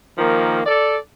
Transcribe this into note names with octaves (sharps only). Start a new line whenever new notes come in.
D#3 F3 A#3
A4 D5